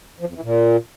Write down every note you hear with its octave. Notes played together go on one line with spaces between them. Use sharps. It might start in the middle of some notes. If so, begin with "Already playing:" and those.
F3
F2
E3
A#2